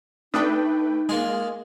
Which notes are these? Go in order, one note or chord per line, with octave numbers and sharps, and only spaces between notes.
A3 D4 D#4 B4 G5 D#6
G#3 A#3 F4 G#4